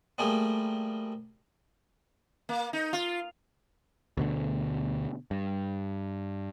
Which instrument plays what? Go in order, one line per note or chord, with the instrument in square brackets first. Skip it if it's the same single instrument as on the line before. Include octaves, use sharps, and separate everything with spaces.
[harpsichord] F3 G3 A3 A#3 G#4
[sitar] A#3
D#4
F4
[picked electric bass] D2 B2 D3
G2